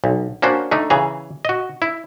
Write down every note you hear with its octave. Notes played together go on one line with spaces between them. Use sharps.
B1
A#3 C#4 D4 F#4 C5
A3 D4 D#4
C#3 E3 G#4 A#5
F#4 D#5
E4